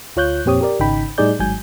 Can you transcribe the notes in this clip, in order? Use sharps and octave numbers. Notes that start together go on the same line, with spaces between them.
D2 F4 C#5 F#6 G6
F2 A#2 C4 G4 C#5 D#6
G4 A#4 D5
G#1 C#3 D#4 G5 B5
A2 G3 D#4 G#4 D5 G6
G#1 G#2 F#3 G#5 G6